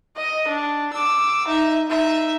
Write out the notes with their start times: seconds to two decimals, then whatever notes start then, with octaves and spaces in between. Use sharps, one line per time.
0.17 D#5
0.48 D4
0.93 D6 E6
1.48 D#4 E5
1.87 D#4 E5